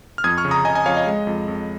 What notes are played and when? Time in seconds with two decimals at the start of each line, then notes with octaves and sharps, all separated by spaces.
0.18 F6
0.24 F2 D#6 G#6
0.38 C#6 F6
0.45 C#3
0.51 A#5 D#6
0.65 C#3 D#5 G#5
0.75 D#5 G#5
0.86 F2 C#5 F5
0.97 D#5
1.06 G#3
1.27 F2
1.48 F2